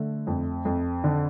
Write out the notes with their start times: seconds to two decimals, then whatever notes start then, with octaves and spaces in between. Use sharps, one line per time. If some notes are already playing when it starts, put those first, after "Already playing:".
Already playing: D3 A3
0.27 F2
0.65 F2
1.04 D3